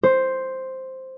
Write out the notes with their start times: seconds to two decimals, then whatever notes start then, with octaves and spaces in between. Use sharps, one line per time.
0.03 C5